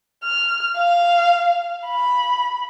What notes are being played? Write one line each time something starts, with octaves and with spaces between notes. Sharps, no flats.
F6
F5
B5